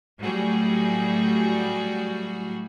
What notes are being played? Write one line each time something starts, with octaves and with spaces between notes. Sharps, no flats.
A2 F#3 G3 F#4 G#4